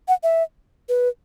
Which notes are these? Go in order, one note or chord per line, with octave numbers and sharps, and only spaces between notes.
F#5
E5
B4